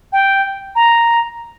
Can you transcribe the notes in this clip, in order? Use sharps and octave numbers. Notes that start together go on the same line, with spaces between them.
G5
A#5